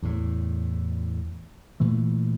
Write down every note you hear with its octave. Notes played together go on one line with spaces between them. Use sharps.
E2 A2
A#2 E3 A3